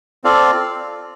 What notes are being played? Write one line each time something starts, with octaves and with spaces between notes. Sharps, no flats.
C4 F4 A4 D5 F5